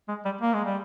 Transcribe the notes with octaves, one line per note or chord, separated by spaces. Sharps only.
G#3
G3
A#3
G#3
G3